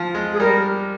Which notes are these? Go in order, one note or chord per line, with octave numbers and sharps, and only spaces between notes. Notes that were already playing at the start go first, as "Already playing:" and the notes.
Already playing: F3
G#3
G#4
G3 A#4